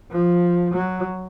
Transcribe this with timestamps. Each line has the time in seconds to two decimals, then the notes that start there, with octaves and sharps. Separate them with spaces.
0.11 F3
0.74 F#3